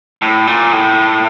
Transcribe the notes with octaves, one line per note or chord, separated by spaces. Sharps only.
A2
A#2
A2